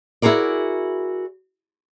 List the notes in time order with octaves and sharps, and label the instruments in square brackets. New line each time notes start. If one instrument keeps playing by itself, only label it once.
[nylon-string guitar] E4 F#4 G#4 A#4 D5